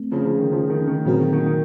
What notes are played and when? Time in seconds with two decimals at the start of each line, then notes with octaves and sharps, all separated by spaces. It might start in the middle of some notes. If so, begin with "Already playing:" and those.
Already playing: A3 C4
0.12 C#3 F3
0.25 C#3 F3
0.39 D#3
0.52 C#3 F3
0.70 D#3
0.87 D#3
1.05 A#2 C#3 F#3 C4 F#4 A#4
1.20 D#3
1.33 D#3
1.46 D#3